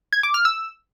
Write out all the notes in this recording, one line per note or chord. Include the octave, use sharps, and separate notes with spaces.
G#6
D6
F6
E6